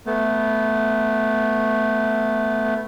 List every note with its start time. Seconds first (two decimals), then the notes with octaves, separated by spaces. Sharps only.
0.06 A3 B3